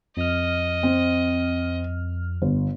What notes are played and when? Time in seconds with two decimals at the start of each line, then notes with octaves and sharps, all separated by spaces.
0.17 F2 D#5 F6
0.83 C4
2.42 G1